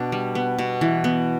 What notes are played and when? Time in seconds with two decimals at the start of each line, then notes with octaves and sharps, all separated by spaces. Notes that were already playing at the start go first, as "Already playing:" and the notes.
Already playing: B2 B3 D4
0.12 G3
0.35 B3
0.59 B2
0.81 E3
1.04 B3